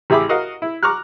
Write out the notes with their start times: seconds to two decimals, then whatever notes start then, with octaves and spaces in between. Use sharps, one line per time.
0.10 A1 G4 G#4 E5 B5 D6
0.29 F#4 A#4 D#5 F5 F#5
0.62 E4
0.83 A#5 C#6 D6 F6 F#6